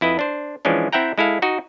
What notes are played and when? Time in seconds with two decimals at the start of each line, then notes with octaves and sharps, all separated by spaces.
0.01 F2 E4 B4 D#5
0.19 D4 C5
0.65 E3 F3 G#3 C#4 D4
0.93 C4 E4 E5 F#5 G5 A#5
1.18 G#3 E4 A4 F5
1.42 D#4 F#4 D#5